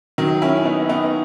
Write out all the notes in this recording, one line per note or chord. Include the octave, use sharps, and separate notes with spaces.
D#3 F#3
C#4 E4
B3 D#4
B3 D#4